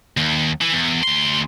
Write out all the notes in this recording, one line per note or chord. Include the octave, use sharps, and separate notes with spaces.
D#2
E3
E2
D2 C6